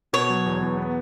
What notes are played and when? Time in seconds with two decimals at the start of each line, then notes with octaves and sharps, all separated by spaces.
0.13 B2 C#5
0.30 F#3
0.46 E2
0.62 E2
0.78 B3